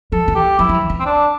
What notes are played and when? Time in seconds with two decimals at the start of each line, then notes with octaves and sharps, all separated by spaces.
0.12 F3 A4
0.28 E3
0.35 G4
0.59 F3 E4
0.69 F3
0.74 E3
0.90 E3
1.00 C4
1.06 D4